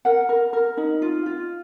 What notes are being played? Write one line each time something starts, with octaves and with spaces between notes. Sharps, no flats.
A#4 F#5
A#4
A#4
D#4
F4
F4